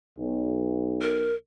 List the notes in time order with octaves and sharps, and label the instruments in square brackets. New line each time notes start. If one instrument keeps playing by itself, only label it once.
[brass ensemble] B1
[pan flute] A#4